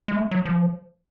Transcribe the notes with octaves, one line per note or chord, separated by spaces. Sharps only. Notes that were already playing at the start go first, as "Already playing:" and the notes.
G#3
A3
F#3
F3